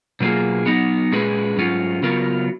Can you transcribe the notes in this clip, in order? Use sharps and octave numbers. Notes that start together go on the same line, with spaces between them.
B2 F#3 A#3 F4 G#4
F#3 B3 D#4
A#2 G#3 C#4 G#4 B4
G#2 F#3 C#4 F4
C#3 F#3 B3 F4 A#4